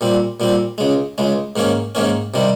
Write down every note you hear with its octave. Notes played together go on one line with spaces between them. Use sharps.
A#2 G3 C4
A#2 G3 C4
C#2 C#3 G#3
C#2 C#3 G#3
G#2 D#3 A#3 C#4
G#2 D#3 A#3 C#4
C3 D#3 G3